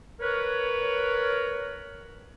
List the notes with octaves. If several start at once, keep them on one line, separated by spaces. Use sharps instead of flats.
A#4 B4 C#5